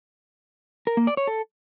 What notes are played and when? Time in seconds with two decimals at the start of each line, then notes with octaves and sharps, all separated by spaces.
0.87 A#4
0.97 A#3
1.07 D5
1.17 C#5
1.27 A4